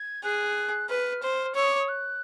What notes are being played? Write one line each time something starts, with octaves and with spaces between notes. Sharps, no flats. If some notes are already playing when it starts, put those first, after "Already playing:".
Already playing: G#6
G#4 F#6
B4 F6
C5
C#5 E6
D#6
D6
D#6
F#6